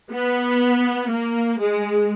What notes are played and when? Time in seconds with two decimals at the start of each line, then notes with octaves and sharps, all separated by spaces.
0.12 B3
1.12 A#3
1.60 G#3